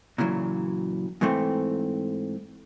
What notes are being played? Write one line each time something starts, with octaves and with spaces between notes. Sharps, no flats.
A#2 C#3 E3 F#3
G#2 E3 A3 C4